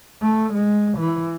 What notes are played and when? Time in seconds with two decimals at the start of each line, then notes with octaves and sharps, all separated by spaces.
0.22 A3
0.53 G#3
0.98 E3